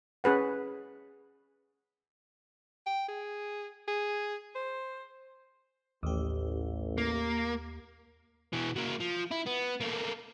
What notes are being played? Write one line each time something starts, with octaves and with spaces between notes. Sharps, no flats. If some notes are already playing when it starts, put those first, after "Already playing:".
C#4 G#4 B4 F#5
G5
G#4
G#4
C5
A1 D#2 G4
A#3
B2 E3
F#3 A#3
F3
E4
B3
A3 A#3